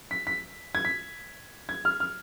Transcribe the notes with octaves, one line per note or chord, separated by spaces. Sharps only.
B6
B6
G#6
B6
G#6
F6
F6